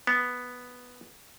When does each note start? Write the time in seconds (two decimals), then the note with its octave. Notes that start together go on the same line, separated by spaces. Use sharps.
0.07 B3